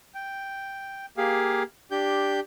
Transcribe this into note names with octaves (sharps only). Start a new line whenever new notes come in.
G5
A#3 G4 G#4 F5
D4 G4 G6